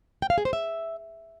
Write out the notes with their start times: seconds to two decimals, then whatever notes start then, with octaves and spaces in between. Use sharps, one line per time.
0.22 G5
0.30 F5
0.38 G#4
0.45 C5
0.53 E5